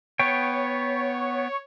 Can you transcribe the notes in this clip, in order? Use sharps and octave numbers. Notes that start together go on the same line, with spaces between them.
B3 C#5 G5